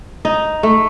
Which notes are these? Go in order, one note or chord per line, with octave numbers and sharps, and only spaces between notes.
D#4
A3